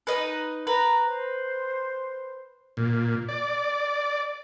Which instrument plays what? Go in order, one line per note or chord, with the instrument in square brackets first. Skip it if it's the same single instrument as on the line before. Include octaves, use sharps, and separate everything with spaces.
[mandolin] D#4 B4
[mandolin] B4 [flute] A#5
[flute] C5
[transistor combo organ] A#2
D5